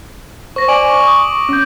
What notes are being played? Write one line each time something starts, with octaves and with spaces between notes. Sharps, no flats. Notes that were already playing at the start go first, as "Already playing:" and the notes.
C5 C#6 A#6
D5 G#5 D6 D7 F#7
C#6
D#6
C#4 G6